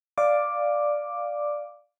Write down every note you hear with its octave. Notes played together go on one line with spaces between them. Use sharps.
D5 F5 D6